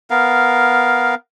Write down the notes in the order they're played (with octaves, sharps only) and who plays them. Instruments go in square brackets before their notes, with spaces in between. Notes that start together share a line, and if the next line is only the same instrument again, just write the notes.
[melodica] B3 A#4 F5